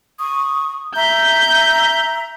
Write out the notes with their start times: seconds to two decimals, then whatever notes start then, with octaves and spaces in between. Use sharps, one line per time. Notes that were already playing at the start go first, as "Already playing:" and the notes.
0.19 C#6 D#6
0.95 E5 A#5 G6